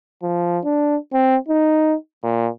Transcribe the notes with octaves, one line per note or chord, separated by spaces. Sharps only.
F3
D4
C4
D#4
A#2